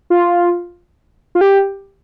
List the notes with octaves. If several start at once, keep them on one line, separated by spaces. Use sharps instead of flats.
F4
F4
G4